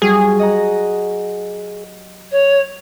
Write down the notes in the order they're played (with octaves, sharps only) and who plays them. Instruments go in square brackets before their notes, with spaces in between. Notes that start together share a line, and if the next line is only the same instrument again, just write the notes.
[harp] G2 F#3 G3 [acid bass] G#4
[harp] D#5 F#5 A#5
[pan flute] C#5